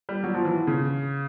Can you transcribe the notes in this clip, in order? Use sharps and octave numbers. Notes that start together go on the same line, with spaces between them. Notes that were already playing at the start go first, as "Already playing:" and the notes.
G3
F#3
F3
E3
C#3